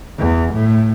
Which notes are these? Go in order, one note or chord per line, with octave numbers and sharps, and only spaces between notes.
E2
A2